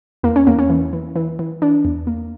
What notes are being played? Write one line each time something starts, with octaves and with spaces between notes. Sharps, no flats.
E2 A#3
C#4
E2 A#3
C#4
E3
E3
E3
E3
E3 D4
E2
A#3